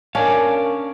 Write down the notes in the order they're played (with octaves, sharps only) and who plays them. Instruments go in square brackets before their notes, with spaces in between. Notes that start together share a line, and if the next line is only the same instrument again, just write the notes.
[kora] C#4 D4 [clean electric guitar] A#4 D5 F5